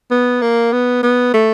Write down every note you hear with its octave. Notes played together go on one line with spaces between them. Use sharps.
B3
A#3
B3
B3
A3